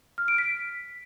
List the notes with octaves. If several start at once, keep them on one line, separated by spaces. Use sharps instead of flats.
F6
D7
B6